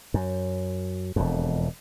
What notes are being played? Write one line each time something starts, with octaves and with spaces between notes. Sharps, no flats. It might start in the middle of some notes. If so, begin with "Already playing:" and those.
F#2
E1 F2